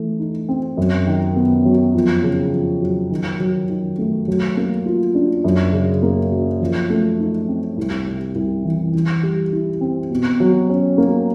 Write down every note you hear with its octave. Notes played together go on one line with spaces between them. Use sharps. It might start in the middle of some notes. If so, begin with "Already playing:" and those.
Already playing: E3 A3
D#4
C4
F#2
D#3
B3
F#3
F2
C#3
F2
F#3
D#3
F#3
D#3
A3
F#3
A#3
F4
D4
F#2
C#3
A#3
F#3
F3
A3
D#4
C4
C2
C3
C2
E3
E3
G3
E4
C4
B2
F#3
C#4
A#3